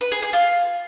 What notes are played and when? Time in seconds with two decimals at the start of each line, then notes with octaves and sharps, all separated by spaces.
0.01 B4
0.12 G#4
0.22 G#4
0.33 F4